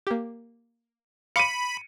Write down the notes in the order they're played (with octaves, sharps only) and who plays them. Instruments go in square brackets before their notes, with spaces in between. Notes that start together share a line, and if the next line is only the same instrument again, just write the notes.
[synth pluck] A#3 G4
[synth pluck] F5 C6 D6 [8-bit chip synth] B5 [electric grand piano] C#7 D#7